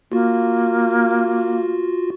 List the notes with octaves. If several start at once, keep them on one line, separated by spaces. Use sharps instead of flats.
A#3 F4 F#4